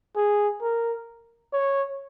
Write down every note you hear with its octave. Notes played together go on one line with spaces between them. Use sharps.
G#4
A#4
C#5